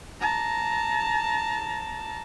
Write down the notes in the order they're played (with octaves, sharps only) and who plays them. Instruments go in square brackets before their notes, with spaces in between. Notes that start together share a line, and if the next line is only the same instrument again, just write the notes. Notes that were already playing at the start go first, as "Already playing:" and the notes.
[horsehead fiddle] A5 A#5